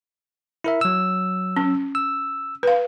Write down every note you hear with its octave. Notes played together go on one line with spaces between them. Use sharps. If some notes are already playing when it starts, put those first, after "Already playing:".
E4 A#4 E5
F#3 E6
C#4
E6
B4 F5